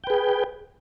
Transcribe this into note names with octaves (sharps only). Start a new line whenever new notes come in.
G#4 B4 G5